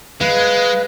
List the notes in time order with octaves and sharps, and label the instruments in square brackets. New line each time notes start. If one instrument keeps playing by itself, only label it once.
[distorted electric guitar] G#3 [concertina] B4 [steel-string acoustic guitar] F5